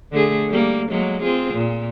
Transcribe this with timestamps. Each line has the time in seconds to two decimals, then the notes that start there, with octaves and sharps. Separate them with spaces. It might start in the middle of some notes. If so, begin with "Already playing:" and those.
0.11 D3 A3 G#4
0.49 G3 A#3
0.89 F#3 G#3 A#3
1.22 C4 F4 G#4
1.54 A#2